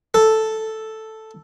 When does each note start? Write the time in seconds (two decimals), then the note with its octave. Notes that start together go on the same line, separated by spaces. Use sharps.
0.14 A4